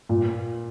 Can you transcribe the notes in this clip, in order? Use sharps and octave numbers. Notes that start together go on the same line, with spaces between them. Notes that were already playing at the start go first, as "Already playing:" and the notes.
A#2